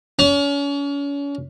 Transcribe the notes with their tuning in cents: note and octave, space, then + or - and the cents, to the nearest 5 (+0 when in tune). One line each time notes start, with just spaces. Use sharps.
C#4 +35